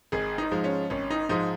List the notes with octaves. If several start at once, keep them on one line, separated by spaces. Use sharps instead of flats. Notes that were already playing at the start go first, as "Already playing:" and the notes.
G#1 G#4
D#4
G#2 F3 G#3
C#4
G#1 C#4
D#4
G#2 F3 G#3 D#4